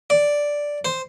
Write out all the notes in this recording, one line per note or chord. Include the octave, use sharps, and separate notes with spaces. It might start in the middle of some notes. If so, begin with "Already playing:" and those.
D5
C5